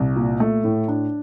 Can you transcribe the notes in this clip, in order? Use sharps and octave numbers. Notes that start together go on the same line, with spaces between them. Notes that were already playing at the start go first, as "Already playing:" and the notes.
Already playing: C2
A#2
A3
A2
D4